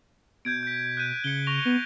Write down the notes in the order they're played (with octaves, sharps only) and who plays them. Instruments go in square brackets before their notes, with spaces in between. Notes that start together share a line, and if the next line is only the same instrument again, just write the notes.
[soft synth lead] B2 [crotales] G6 G#6 D7
[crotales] G6 B6
F#6 G6 D#7
[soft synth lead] C#3 [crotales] C#7 G7
[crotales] C#6 A#6 F7
[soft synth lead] B3